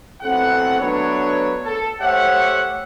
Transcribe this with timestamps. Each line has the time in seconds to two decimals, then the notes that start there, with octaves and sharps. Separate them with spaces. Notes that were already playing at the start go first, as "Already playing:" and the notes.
0.22 B1 A2 C4 A4 F#5
0.80 F#3 A3 B3 D4 B4 C#5
1.65 A4
2.01 A3 G4 C5 C#5 E5 F#5